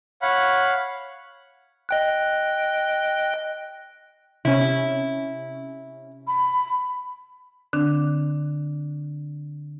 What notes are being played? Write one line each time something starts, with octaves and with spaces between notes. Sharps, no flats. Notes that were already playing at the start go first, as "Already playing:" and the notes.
C#5 F5 F#5 B5
D#5 G5 F#6
C3 C#4 E4
B5
D3 C4 D4